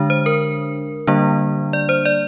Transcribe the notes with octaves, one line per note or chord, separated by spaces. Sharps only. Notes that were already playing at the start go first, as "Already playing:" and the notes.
Already playing: D3 G#3 D4
C5
A#4
D3 G3 A#3 D4
D5
C5
D5